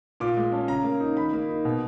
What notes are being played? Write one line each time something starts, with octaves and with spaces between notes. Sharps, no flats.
A#2 D6
G#3
C#4 A5
C#3 A#5
A#3
D#4
D#3 B5
A#3
D#4
B2